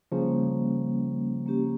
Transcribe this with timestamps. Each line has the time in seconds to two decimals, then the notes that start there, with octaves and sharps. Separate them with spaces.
0.12 C#3 F3 G3 A#3 C#4
1.46 A#3 C#4 G4